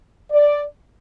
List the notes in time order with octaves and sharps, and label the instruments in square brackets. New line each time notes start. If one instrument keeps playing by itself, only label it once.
[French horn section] D5